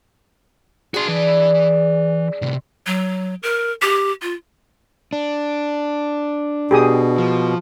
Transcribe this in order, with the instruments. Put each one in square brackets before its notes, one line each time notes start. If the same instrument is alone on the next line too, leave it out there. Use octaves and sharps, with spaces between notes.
[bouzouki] D4 G#4 [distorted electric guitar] F#4 C6
[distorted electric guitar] E3 B4
A2 C3
[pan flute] F#3
A#4
G4
F4
[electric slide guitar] D4
[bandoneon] B2 [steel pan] G4 G#4 D#6
[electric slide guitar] F3